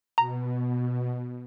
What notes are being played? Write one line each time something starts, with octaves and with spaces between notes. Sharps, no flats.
B2 A#5